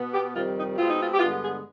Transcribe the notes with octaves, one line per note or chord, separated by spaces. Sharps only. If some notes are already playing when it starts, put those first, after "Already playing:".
Already playing: B2 B3
G4
F2 C3 D#3 G3 C4 F4
D#4
B2 G#3 C4 F4
D#4
F4
G4
G2 D3 G#3 B3 F4
G#4